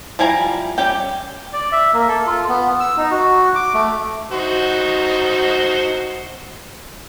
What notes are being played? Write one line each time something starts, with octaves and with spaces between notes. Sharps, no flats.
F3 G3 E4 G#5 A#5
G3 C#4 G4 G5
D5
E5
A#3
A4
F4
B3
E6
D#4
F#4
D6
A3
D#4 F#4 C5